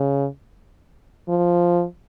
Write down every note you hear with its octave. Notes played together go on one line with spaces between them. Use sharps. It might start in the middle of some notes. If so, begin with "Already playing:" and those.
Already playing: C#3
F3